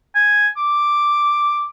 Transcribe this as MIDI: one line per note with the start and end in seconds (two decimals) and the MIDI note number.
0.15 0.48 80
0.57 1.68 86